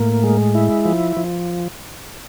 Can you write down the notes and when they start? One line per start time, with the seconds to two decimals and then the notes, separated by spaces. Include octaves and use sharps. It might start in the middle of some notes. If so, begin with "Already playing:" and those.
Already playing: A2 A#3
0.23 G#3
0.55 E4
0.85 F3
1.17 F3